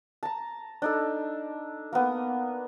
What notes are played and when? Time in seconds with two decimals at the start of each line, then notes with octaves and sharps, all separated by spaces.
0.23 A5 A#5
0.82 D4 D#4 A4
1.93 A#3 B3